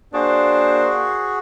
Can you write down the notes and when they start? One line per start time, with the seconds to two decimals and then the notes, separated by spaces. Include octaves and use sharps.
0.14 A#3 D4 F#4 G#4 C5